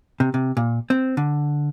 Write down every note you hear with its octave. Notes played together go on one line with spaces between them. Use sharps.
C3
C3
A#2
C4
D3